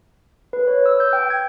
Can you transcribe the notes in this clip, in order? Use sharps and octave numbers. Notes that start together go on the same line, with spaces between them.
B4
C#5
E6
G6
G5
G#6